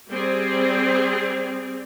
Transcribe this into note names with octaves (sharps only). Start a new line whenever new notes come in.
G3 C4 G#4